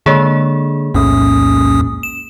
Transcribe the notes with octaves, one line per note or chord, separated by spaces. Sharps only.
D3 G#3 A#3 G#4
B1 E2 A2 C#4 D#6
E7